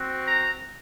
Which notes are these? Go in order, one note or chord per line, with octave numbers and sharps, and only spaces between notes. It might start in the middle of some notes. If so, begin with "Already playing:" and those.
Already playing: C4 F#4
A#5